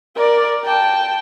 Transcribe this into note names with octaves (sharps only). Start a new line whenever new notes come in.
A#4 D5
G5 A5